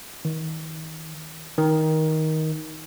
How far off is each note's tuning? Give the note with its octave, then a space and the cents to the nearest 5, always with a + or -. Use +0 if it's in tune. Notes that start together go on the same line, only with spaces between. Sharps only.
D#3 +35
D#3 +15